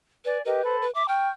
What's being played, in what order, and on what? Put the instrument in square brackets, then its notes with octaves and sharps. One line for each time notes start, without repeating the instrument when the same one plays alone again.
[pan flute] B4 [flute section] D5 G#5
[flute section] G4 A#4 D#5 [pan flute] B4
[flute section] A4 C5 B5
[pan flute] B4
[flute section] E5 [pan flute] D6
[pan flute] G5 [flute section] C#6 F6 G6